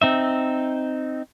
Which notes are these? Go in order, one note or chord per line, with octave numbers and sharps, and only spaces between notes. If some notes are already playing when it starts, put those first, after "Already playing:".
C4 D#4 E5